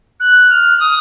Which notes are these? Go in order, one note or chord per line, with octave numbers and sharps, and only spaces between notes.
F#6
F6
D#6